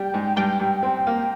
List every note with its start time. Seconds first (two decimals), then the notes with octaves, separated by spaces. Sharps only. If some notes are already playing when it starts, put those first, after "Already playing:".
Already playing: G3 G5
0.14 G#2
0.36 G2 G5
0.60 G2
0.83 C4
1.07 A#3